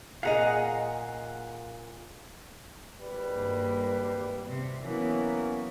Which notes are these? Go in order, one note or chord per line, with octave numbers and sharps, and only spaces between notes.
A#2 G#4 D#5 F5 F#5 A#5
G#1 G3 B4
G2 A#3
C3
E3 F#3 A#3 B3 C#4